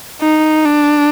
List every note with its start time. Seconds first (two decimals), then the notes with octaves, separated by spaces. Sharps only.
0.21 D#4
0.65 D4